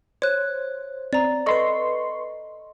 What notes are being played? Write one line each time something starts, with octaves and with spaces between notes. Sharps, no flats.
C5 C#5 F#6
C4 D5 A#5
A4 B4 D#5 C6 C#6